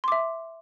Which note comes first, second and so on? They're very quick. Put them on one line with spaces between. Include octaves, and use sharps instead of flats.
C6 D6 E5